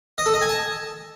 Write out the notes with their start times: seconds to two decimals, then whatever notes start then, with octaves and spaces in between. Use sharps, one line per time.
0.18 D#5
0.26 A4
0.34 D#5
0.41 G#5
0.49 A5